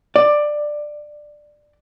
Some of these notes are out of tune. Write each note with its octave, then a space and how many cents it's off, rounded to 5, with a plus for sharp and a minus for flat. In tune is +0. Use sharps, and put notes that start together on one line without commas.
D5 +15